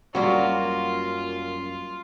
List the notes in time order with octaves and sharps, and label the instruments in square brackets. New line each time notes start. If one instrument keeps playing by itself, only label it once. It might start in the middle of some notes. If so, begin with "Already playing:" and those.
[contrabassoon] F#2 [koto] F#3 G3 [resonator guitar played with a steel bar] A#3 F#4 [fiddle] F4